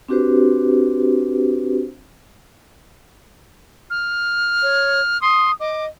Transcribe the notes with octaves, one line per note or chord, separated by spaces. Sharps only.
C4 D4 F#4 G4 B4 C5
F6
C#5
C6 D#6
D#5 D6